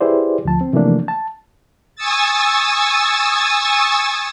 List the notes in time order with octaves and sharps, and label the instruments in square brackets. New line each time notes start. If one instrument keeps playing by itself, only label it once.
[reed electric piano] E4 G4 G#4 B4 C5 D5
D2 F3 A5
C4
C3 E3 F3 A3 A#3 D4
A5
[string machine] G#5 C#6 D#6 E6 A6